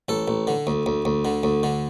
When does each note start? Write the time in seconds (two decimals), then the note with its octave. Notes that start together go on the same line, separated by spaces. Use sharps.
0.09 A1 A4
0.28 A1
0.47 D3
0.67 D2
0.86 D2
1.05 D2
1.25 D3
1.43 D2
1.63 D3